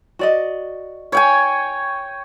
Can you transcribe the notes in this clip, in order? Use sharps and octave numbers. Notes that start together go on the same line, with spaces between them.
F#4 D5 D#5
C#5 G5 G#5